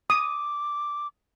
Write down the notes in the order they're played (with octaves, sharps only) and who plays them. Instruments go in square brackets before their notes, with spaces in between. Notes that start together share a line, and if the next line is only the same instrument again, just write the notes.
[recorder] D6 [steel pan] D#6